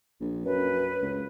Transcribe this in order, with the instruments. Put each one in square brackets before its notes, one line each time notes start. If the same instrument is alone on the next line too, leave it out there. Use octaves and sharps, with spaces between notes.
[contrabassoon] A#1
[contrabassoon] F#2 [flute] B4
[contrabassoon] C#2